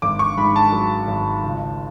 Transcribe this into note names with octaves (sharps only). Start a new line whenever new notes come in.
G#1 D6
C#6
G#2 B5
A5
F#3
G#1
C#2